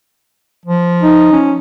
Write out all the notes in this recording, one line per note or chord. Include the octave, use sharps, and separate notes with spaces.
F3
D#4
C#4